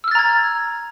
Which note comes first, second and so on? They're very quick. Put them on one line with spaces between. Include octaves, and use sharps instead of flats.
E6 F6 A6 A#5 G#6